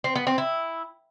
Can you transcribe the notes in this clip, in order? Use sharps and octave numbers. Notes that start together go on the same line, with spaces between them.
C4
B3
C4
E4